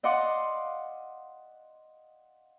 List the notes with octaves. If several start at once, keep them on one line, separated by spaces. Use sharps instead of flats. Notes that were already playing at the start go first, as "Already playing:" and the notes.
D5 D#5 F5 F#5 C6 D6